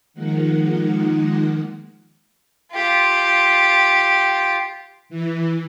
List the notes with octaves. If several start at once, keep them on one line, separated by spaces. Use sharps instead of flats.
D#3 F3 G#3 A#3 D#4 F#5
F4 G4
E3